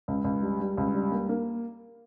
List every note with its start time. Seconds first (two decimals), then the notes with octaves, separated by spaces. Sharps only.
0.08 C#2
0.24 C#2
0.42 G3
0.60 G3
0.77 C#2
0.94 G3
1.12 A#3
1.29 A#3